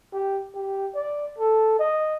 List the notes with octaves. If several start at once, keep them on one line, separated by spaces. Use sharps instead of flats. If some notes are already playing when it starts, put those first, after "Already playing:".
G4
G4
D5
A4
D#5